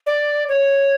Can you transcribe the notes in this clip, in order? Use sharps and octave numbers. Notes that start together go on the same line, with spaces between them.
D5
C#5